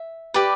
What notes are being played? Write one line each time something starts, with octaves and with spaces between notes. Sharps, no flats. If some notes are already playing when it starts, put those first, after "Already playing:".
Already playing: E5
G4 B4 D5